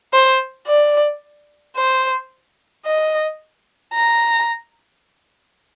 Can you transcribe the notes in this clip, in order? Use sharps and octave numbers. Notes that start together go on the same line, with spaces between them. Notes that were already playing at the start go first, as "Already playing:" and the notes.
C5
D5
C5
D#5
A#5